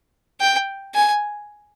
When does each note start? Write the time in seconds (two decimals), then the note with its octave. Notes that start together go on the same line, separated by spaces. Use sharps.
0.41 G5
0.95 G#5